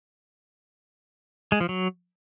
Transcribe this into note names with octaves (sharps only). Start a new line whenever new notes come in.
G#3
F3
F#3